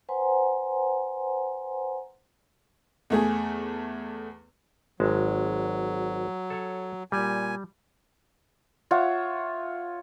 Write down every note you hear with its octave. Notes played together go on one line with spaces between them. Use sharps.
B4 C5 F#5 G#5 A#5 C6
E2 A3 G#4
G#1 F#3 G#3 A5
A4 C#5
A#2 G3 G#5
F4 C#5 E5 F#5